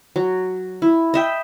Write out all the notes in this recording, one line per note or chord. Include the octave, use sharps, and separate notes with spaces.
F#3
E4
D#5 E5 G5